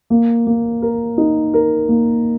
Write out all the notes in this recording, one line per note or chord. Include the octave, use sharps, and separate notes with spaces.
A#3
A#3
A#4
D#4
A#4
A#3